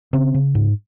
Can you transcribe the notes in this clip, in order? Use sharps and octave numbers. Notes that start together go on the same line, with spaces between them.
C#3 C4
C#3
G#2